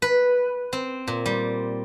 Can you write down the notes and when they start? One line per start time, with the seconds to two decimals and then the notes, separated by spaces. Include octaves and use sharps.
0.02 B4
0.73 C4
1.07 A#2
1.26 G3